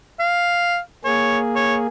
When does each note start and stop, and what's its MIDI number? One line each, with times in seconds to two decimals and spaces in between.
0.20 0.78 77
1.05 1.87 58
1.05 1.87 68
1.05 1.39 73
1.56 1.76 73